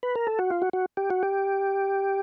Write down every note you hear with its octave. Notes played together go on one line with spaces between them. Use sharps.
B4
A#4
A4
F#4
F4
F#4
F#4
G4
F#4
G4